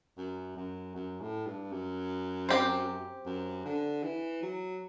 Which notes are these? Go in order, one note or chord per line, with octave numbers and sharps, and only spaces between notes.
F#2
F#2
F#2
A2
G2
F#2
C4 G4 C5
F#2
D3
E3
F#3